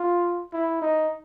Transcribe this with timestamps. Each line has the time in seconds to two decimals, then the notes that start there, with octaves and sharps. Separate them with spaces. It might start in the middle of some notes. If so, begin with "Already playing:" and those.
Already playing: F4
0.53 E4
0.82 D#4